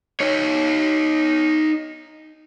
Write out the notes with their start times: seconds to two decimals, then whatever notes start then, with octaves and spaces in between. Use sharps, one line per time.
0.20 D#4 C#5